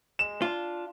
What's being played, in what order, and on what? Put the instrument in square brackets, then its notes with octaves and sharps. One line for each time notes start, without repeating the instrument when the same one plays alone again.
[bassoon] G#3 [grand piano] E7
[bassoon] D4 [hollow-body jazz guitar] F4